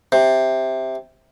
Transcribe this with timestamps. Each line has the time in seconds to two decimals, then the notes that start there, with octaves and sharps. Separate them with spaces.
0.12 C3